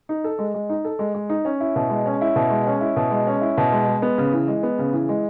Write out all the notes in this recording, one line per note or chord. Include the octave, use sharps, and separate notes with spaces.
D#4
A4
G#3
G#3
D#4
A4
G#3
G#3
D#4
C#4
E4
B2
G#3
C#4
E4
B2
G#3
C#4
E4
B2
G#3
C#4
E4
B2
G#3
G#3
B3
C#3
E3
G#3
B3
C#3
E3
G#3